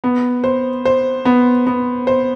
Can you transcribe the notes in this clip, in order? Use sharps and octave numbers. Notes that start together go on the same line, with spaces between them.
B3
C5
C5
B3
B3
C5